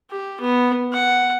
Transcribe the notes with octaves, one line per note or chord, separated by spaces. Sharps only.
G4
B3
F#5